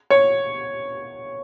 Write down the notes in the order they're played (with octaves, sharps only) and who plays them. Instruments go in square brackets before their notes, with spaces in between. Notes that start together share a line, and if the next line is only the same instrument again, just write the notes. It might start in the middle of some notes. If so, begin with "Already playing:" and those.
[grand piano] C#5